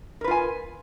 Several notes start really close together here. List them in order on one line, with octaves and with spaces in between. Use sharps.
A#4 B4 F4 G#5